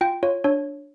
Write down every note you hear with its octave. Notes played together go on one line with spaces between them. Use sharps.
F4 G5
F4 C#5
D4 C#5